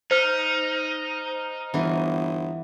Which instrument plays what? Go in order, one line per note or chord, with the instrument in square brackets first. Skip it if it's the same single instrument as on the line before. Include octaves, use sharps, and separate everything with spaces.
[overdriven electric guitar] D#4 [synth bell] C5 F6
[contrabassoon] G1 [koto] E3 B3